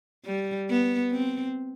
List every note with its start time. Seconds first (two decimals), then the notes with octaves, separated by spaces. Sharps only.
0.25 G3
0.69 B3
1.12 C4